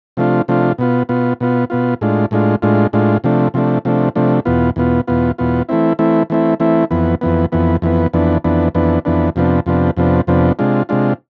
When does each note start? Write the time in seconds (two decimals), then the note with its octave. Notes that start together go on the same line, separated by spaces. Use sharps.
0.17 C3 F3 A3 D4 F4
0.48 C3 F3 A3 D4 F4
0.78 B2 B3 F4
1.09 B2 B3 F4
1.40 B2 B3 F4
1.70 B2 B3 F4
2.01 A2 G#3 D4 F4
2.31 A2 G#3 D4 F4
2.62 A2 G#3 D4 F4
2.93 A2 G#3 D4 F4
3.24 C3 F3 A3 D4
3.54 C3 F3 A3 D4
3.85 C3 F3 A3 D4
4.16 C3 F3 A3 D4
4.45 E2 B2 B3 F4
4.76 E2 B2 B3 F4
5.07 E2 B2 B3 F4
5.38 E2 B2 B3 F4
5.69 E3 A3 C4 E4
5.99 E3 A3 C4 E4
6.30 E3 A3 C4 E4
6.60 E3 A3 C4 E4
6.91 F2 E3 B3
7.21 F2 E3 B3
7.52 F2 E3 B3
7.82 F2 E3 B3
8.13 F2 E3 B3 D4
8.44 F2 E3 B3 D4
8.75 F2 E3 B3 D4
9.05 F2 E3 B3 D4
9.36 F2 C3 F3 B3 D4
9.66 F2 C3 F3 B3 D4
9.97 F2 C3 F3 B3 D4
10.27 F2 C3 F3 B3 D4
10.59 C3 G#3 D4 F4
10.89 C3 G#3 D4 F4